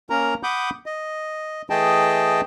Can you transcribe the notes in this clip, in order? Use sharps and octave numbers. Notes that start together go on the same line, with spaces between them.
A#3 C#4 A#4 A#5
F#5 B5 D6 D#6 G6
D#5
E3 A3 G#4 D#5 G5 A5